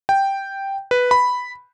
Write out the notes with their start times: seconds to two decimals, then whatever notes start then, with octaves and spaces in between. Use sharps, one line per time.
0.09 G5
0.91 B4
1.11 B5